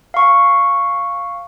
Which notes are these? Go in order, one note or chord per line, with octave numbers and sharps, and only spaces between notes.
F5 C#6